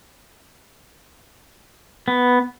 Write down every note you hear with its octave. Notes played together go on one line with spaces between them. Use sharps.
B3